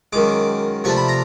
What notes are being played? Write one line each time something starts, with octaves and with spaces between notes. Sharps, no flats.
F#2 D#3 G#3 D6
C3 F3 A3 D4 C#6
B5
A#5